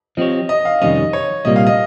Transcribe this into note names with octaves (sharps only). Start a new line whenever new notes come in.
F3 C4 G4 C#5 D#5
D#5
F5
F2 C3 D#3 G3 C#4 D#5
C#5
C2 A#2 G3 A#3 D#5
F5
D#5